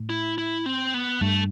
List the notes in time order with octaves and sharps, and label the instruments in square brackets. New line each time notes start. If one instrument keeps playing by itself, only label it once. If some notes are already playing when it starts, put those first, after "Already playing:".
Already playing: [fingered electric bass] A2
[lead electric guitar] E4
E4
C4
B3
[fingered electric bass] G2 [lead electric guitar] A3